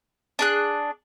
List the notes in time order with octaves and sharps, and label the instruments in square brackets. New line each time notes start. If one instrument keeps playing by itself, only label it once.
[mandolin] D4 G#4 F#6